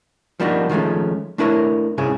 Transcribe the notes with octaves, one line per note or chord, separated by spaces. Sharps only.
F3 G3 A#3 D4 D#4 F#4
D#3 F3 G#3 A3 C#4
A3 D4 E4 A#4 B4 C#5
C2 G#2 C#3 E4 G#4 C#5